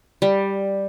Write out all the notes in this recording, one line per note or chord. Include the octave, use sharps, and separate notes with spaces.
G3